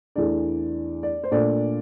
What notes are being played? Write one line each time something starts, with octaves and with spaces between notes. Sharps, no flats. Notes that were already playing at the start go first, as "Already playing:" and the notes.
E2 E3 A3 D4 D5
D5
C5
A#2 A3 D4 D5